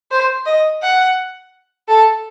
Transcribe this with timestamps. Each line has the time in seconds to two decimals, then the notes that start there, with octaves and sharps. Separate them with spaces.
0.11 C5
0.46 D#5
0.82 F#5
1.88 A4